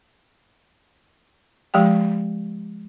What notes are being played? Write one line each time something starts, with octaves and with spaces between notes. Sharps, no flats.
F3 G#3 G4 G5